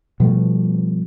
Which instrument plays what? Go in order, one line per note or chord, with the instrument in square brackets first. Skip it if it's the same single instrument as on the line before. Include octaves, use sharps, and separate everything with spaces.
[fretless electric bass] B2 F3 G3 A3